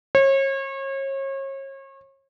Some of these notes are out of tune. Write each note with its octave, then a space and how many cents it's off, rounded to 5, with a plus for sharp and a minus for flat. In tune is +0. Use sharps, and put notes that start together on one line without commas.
C#5 -35